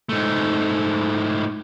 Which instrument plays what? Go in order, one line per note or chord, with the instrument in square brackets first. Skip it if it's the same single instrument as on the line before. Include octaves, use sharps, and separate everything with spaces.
[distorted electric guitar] G#2 A3